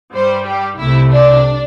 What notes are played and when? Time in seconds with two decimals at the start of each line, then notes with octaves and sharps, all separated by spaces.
0.13 G2 G3 C5
0.45 G4
0.78 C2 C3 A3 E4
1.11 D4